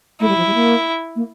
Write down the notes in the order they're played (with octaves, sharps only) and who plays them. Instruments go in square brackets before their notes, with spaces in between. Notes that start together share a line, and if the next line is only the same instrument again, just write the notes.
[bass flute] A3 [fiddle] E4
[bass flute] G3
F3
G3
A#3
A#3